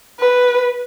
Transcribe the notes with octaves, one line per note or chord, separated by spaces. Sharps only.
B4